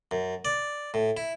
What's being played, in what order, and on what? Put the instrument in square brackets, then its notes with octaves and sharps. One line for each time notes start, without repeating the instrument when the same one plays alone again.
[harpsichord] F#2
D5
A2
E4